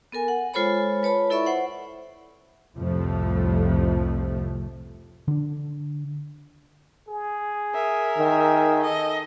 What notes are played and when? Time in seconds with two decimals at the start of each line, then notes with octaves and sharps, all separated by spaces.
0.12 B3 A4 A#4 G#5
0.28 F#5
0.54 G#3 F4 A4 C5 C#5 B5
1.03 B4 C#5 A5 B5
1.30 E4 A4 D5 E5 B5 C#6
1.46 C5 F#5
2.76 C2 F2 A2 C3 F3 A3
5.28 D3 D4
7.08 G#4
7.73 A#4 E5
8.18 D#3
8.83 A4 D#5